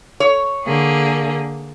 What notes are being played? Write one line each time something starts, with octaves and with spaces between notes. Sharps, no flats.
C#5
D3 A#3 G#4